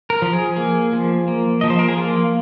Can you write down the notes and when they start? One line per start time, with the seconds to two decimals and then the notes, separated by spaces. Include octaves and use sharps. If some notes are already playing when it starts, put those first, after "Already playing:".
0.10 A#4
0.22 F3
0.33 G#4
0.56 A#3 G#4
0.93 F3
1.28 A#3
1.61 F3 D#5
1.70 C5
1.79 A#4
1.88 G#4
1.98 A#3 F4